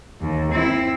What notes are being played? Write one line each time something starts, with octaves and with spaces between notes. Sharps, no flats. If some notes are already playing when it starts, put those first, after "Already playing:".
D#2
C4 E4